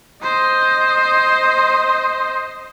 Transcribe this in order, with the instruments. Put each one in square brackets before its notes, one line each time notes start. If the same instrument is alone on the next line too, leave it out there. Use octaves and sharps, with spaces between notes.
[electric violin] C5 D#5